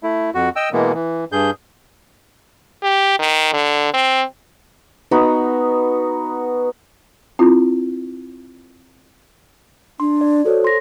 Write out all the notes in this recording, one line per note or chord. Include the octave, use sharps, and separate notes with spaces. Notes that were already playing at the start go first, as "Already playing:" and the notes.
A3 E4
F2 F#4
D#5 G5 E6
B2 E3 G#3 A#3 B3
E3
G2 G#4 G6
G4
D#3
D3
C4
B3 D#4 F#4
C4 E4 F4
D4 C6
D5
F#4 A4 C5 C#5
C6 A#6